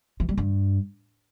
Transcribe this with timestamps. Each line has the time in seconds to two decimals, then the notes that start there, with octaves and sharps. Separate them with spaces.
0.20 E3
0.29 G3
0.38 G2